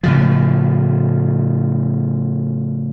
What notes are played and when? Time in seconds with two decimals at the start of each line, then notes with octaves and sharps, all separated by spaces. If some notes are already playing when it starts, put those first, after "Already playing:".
0.03 A2 C#3 F3